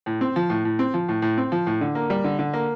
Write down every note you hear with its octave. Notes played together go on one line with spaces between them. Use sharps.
A2
C4
F3
A2
A2
C4
F3
A2
A2
C4
F3
A2
D3
A#3
G3
D3
D3
A#3